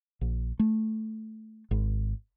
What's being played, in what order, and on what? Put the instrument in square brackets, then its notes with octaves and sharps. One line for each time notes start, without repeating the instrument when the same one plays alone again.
[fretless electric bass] A#1
A3
G#1